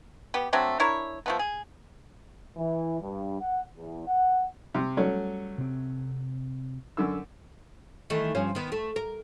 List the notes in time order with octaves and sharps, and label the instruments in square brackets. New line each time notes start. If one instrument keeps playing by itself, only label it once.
[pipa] B3 G4
F#3 A3 C4 D4
D4 E4 A#4 C#5
F3 A3 B3
G#4
[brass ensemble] E3
G2
F#5
E2
F#5
[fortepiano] C3
[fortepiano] F#3 A3 C#4 [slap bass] G3
[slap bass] C3 C4
[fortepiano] F#2 D3 E6
[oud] D#3 E3 A3
G2 F3 C#4
D#3 B3
A3
A#4